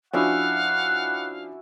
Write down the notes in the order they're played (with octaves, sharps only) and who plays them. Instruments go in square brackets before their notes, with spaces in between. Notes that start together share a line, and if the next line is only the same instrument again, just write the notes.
[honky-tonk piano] F3 C#4 D4 [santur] E4 F#4 G#5 [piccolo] F5 [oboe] F#5